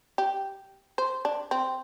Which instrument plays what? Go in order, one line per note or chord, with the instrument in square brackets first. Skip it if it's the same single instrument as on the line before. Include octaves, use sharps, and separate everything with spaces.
[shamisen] G4
C5
D4
C4